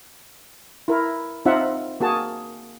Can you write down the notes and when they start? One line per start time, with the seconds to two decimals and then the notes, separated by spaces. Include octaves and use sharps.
0.88 E4 A#4
1.46 C4 D#4 F4 E5 F#5
2.00 A#3 F#4 G#4 A5